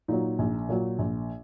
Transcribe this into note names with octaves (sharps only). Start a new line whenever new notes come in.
A#2 F#3 D#4
A#1
A#2 F#3
A#1